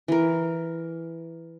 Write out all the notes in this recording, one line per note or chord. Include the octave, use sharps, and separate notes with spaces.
E3 A#4